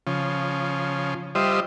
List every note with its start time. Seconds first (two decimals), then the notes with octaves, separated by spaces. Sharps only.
0.07 C#3 F3
1.35 G3 F4 C5 D#5 E5